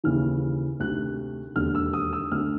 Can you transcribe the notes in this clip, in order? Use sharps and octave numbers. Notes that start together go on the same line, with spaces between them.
D#2 C#3 E3 F6
D2 C3 D#3 F#6
E1 D#2 D3 F6
E6
D#6
E6
D2 D3 F6